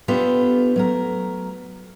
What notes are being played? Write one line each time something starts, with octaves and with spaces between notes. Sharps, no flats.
B3 D4 F4 G4 A4
F#3 A3 A#4